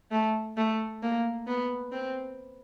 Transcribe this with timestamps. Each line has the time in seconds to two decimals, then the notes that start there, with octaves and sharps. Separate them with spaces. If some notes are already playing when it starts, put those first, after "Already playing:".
0.12 A3
0.57 A3
1.02 A#3
1.47 B3
1.93 C4